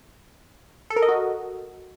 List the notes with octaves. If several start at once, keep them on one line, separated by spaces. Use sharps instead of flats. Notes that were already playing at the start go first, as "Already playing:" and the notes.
A4
A#4
D#5
F#4